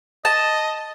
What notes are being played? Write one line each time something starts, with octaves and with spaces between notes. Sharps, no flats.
D#5 A5